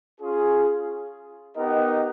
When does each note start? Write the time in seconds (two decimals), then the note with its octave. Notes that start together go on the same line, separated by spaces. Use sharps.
0.20 C#4 F4 G#4
1.56 B3 D#4 G4 A#4 D#5